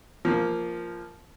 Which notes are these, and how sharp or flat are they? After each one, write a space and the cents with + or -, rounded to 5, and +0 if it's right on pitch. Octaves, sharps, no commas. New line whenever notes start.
F3 -5 A#3 +0